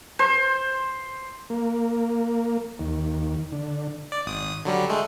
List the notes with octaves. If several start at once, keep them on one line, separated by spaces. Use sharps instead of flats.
C5
A#3
D#2
D3
D5
G#1 D#6
D3 F#3 G3
G#3 A3